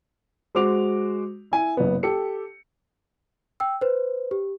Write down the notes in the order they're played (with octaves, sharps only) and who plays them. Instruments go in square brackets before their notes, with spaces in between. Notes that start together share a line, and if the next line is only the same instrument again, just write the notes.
[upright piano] G#3 F#4 C5 D6 F7
E4 G#5
F#1 B3
G4 A4 C#7
[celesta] G5 E6
B4 C5
G4